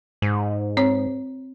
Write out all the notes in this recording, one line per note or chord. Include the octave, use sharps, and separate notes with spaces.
G#2
C4 C#5